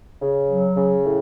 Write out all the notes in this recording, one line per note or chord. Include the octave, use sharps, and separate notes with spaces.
C#3
F#3
C#3
A2